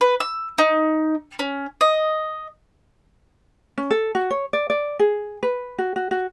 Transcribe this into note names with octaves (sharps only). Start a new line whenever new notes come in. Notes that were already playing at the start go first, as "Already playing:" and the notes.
B4
E6
D#4
C#4
D#5
C#4
A4
F#4
C#5
D5
D5
G#4
B4
F#4
F#4
F#4